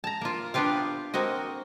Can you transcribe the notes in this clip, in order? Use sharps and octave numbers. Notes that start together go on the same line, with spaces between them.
A5 A#5
A#3 F4
B3 D4 F4 G4 F5
A#3 C4 F#4 D#5